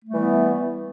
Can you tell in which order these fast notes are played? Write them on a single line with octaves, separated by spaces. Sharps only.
A3 G3 E3 B3